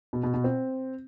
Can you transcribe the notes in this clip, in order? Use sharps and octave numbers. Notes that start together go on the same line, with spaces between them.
B2
B2
B2
C4